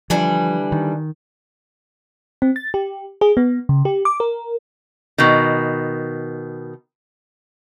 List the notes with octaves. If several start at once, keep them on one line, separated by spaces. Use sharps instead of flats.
D3 E3 F3 G3
D#3
C4
A6
G4
G#4
B3
C#3
G4
D6
A#4
B2 D#3